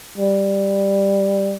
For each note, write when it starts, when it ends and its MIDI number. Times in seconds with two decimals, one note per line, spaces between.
0.18 1.56 55